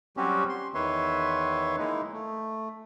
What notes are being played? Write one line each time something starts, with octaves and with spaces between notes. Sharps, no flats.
F#3 G3 C4 C#4 F#4 G4
C6
E2 D#3 B4 C#5 E5 C6
G#3 A#3 D#4 E4
A3